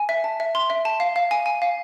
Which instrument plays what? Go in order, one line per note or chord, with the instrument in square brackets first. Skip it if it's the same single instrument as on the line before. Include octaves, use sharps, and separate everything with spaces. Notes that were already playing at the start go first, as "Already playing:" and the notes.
Already playing: [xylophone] G#5
E5
A5
E5
C6
E5
A5
F5
F5
G#5
G#5
F5